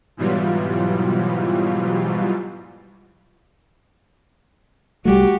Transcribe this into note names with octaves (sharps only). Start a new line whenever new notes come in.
G#2 B2 E3 F#3 G3 F4
C2 G3 A3 F#4 G4